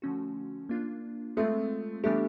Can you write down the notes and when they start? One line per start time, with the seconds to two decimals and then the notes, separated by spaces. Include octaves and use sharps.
0.02 D3 F3 A3 C#4 F#4
0.69 A#3 D4 F4
1.37 G#3 A3 C4 F4
2.04 E3 G3 A3 B3 D4 G4